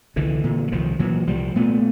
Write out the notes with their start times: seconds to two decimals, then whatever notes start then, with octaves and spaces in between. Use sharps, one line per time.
0.16 C2 D3 E3
0.44 A#2
0.68 F#3
0.72 C2 D#3 F3
0.99 A#2 E3 F#3
1.27 C2 F3 G3
1.56 A#2 A3 B3